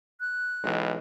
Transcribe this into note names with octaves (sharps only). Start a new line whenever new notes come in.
F#6
B1 E3 G#3